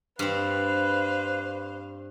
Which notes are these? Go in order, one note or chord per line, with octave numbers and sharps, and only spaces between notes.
G2 C4 B4 C5 F5